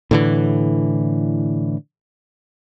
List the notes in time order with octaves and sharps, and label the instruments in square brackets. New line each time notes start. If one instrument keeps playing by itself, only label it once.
[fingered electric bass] A2 D3 E3